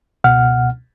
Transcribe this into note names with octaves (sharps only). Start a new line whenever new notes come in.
C#2 B2 F#5 F6